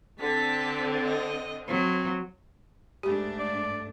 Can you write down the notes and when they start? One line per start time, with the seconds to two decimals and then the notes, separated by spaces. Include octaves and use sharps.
0.20 D3 C4 A5 B6
1.06 D#5
1.68 F#3 C4
3.03 G#2 G3 A3 D4 G4 G#4
3.39 D5